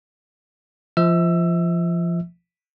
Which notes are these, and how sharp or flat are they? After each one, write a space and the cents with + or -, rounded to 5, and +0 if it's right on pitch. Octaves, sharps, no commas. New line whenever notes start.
F3 -25 E5 -40 E6 +20